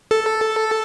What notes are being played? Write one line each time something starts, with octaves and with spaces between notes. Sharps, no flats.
A4